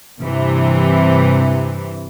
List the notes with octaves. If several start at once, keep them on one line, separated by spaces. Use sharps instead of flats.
G2 C3 E3